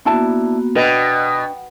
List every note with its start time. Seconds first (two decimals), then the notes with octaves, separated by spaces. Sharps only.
0.05 A#3 B3 D4 E4 F#4 A5
0.75 B2 D4 B4 D#5 G5